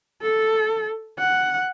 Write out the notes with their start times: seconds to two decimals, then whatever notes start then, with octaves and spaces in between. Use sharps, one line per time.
0.22 A4
1.19 F#5